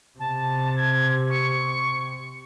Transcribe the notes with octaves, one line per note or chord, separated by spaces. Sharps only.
C3 A5
G#6
C#6